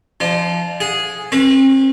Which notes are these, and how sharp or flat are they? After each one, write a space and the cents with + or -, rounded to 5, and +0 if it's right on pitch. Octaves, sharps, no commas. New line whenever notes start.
F3 -20 D4 +40
G#4 +0 F#5 -30
C4 +40 B4 -30